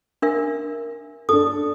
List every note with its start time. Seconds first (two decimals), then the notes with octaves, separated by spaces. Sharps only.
0.22 D4 A#4 E5
1.29 D4 A4 D#6